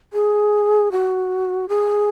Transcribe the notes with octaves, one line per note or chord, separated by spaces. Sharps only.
G#4
F#4
G#4